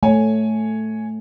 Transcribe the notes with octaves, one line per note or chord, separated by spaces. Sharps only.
A3 C#5 G#5